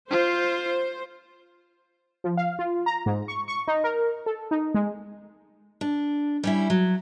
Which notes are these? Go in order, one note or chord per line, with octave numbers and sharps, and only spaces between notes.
F4 C5
F3
F5
F4
A#5
G#2
C#6
C#6
D#4
A#4
A4
D#4
G#3
D4
G3 C#4 E4
F#3